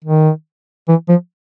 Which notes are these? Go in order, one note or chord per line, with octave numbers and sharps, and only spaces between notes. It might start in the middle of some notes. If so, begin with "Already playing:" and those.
D#3
E3
F3